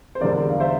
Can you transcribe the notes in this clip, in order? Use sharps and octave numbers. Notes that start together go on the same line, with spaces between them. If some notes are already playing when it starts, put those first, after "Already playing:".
C5
E1 E2 D3 G3 A#4 D5
F5
C5 E5